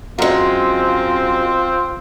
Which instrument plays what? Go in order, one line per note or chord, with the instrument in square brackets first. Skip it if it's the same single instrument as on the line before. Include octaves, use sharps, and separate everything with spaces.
[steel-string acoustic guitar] F#2 G#3 [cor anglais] C4 [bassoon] F4